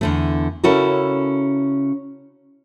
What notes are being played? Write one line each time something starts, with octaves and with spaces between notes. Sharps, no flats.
E2 D3 A3
C#3 C#4 E4 F#4 A4 A#4